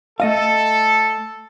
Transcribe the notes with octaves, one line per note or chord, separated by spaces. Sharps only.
A3 A4 D#5 F5